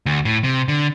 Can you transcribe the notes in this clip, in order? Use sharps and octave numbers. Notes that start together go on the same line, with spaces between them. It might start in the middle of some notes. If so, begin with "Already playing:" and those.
D2
A2
C3
D3